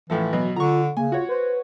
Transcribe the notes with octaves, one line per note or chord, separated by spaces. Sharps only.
A2 E3 F3 A4 E5
B2 F#3 F#4
D3 F4 A#5 C#6
C#3 A#3 G#5
F4 F#4 C#5
B4 C5